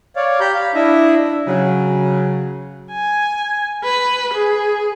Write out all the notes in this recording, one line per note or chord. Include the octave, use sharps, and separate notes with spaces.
C#5 D5 F5
G4 A#5 B5 G6
F5 B5
D4 E4 D#5 E5
C#3 F#3
G#5
B4
G#4